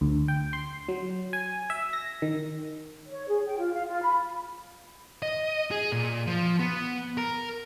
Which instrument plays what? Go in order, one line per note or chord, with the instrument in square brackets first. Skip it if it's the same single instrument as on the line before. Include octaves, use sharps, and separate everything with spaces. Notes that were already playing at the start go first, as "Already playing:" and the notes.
[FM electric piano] D2
G5
C6
F#3
G#5
E5
A#6
D#3
[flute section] C#5
G#4
G5
F4
F5
F4
B5
[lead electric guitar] D#5
G#4
A#2
F3
B3
A#4